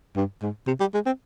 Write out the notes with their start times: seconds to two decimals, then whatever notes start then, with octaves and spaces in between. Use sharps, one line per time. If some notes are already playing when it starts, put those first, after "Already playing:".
0.16 G2
0.42 G#2
0.67 C3
0.80 G3
0.94 G#3
1.06 C4